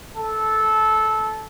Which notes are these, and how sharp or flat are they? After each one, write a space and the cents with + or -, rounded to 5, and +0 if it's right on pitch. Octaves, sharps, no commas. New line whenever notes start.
A4 -15